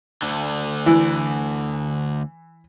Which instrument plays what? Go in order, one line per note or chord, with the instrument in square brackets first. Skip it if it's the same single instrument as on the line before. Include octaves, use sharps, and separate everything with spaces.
[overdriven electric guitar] D2 D3
[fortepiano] E3